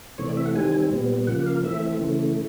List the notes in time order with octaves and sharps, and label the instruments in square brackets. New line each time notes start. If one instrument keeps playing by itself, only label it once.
[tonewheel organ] C3 E3 A3 C4 C#5
D5
E5
F#5
D#3 G3 C4 G#5
A#2 G3 B3
C#3 F3 A#3 F#5
F5
E3 A3 C4 E5
C#3 E3 A3